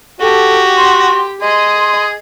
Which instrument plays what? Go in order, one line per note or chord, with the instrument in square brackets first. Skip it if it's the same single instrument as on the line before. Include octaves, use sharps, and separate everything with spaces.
[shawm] F#4 [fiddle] G4 [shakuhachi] A4
[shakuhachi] C6
[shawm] G#4 [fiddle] D#5 [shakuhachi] C6